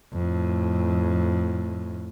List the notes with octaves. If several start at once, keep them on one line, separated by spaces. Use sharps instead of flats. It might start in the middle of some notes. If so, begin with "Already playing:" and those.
F2 A2